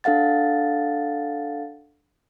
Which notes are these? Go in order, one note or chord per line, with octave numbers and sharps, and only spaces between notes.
D4 A4 F5 F#5 A6